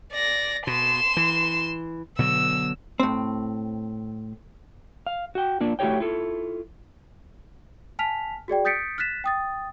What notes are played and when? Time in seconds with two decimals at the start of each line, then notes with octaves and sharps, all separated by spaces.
0.13 D5 A#6
0.67 B2 C6 E7
1.17 E3
2.19 B2 D3 F#3 E6
3.00 A2 C4
5.06 F5
5.35 F#4 G5
5.61 A#3 D4 F4
5.79 A3 E4 F#4 G4 C#5 G5
6.00 E4 F4 A4
7.99 G#5 A5 F6 B6 F7
8.48 F#4 G#4 D5 G5
8.65 D#6 G6 A6 B6 C#7 D7
8.98 F6 F#6 A6 B6 E7
9.24 G5 D#6 A6